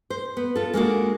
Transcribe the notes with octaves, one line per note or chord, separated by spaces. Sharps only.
C5
B3
F4 A4
G#3 A#3 D4 F#4